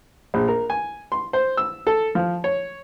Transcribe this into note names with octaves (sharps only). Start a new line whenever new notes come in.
A#1
A#4
G#5
C6
C5
E6
A4
F3
C#5